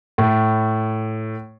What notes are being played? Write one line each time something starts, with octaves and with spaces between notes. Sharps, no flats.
A2